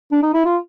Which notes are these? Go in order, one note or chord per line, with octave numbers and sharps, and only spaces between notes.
D4
D#4
E4
F4